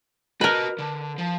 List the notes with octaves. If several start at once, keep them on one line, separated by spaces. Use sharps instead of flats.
F#4 A#4 B4 D#5
D3
F3